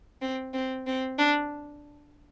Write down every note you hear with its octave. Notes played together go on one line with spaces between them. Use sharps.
C4
C4
C4
D4